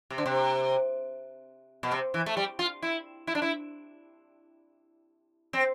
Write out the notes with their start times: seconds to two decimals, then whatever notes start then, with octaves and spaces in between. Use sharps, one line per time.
0.10 C3
0.18 D3
0.26 C3
1.83 B2
1.92 C3
2.14 E3
2.26 A3
2.37 G3
2.59 F4
2.83 E4
3.27 E4
3.35 D4
3.42 E4
5.53 C4